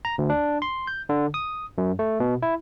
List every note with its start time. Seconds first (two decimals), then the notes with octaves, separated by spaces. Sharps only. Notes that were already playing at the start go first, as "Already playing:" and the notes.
0.05 A#5
0.18 D2
0.30 D4
0.62 C6
0.87 G6
1.09 D3
1.34 D#6
1.78 F#2
1.99 A3
2.20 B2
2.42 E4